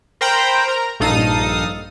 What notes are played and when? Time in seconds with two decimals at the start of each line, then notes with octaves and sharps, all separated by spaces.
0.21 A#4 C5 G5 A#5 B5
0.68 A#4 A#5
1.00 A#1 G2 D#4 A4 F5 D#6